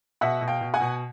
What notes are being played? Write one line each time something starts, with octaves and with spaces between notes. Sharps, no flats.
B2 E5 F#5
B2
F5 G5
B2
F#5 G#5
B2